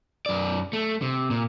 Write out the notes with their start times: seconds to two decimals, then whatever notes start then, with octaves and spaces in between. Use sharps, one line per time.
0.26 F#2 D5
0.73 A3
1.02 C3
1.31 A#2